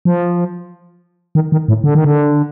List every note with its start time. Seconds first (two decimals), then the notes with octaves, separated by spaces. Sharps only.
0.05 F3
1.35 D#3
1.52 D#3
1.68 A2
1.84 D3
1.95 D#3
2.04 D3